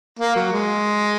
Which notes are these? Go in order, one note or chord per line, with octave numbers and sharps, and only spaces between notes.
A#3
F#3
G#3